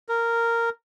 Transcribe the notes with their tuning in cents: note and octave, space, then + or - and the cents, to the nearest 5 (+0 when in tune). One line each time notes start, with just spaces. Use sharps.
A#4 -10